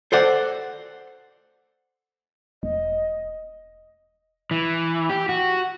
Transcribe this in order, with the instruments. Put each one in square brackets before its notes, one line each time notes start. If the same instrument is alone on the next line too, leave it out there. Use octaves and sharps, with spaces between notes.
[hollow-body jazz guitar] A4 C5 D5 F#5
[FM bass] E1 [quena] D#5
[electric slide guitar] E3
G4
F#4